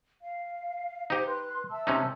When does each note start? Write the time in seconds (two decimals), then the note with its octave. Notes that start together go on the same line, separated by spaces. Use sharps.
0.21 F5
1.10 D#4 G4 C5
1.27 B4 C6 F#6
1.70 E5 A5 E6
1.87 C3 C#4 D#4